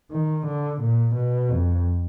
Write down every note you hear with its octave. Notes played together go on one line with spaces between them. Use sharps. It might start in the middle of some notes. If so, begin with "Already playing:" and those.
D#3
D3
A#2
B2
F2